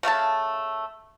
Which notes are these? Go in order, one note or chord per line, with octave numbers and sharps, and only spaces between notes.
C#3 A3 F5 A5